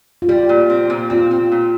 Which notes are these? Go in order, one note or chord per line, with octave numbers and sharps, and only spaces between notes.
F4
G3 G4
A#2
C4
A#2
C4 F4
C4
A#2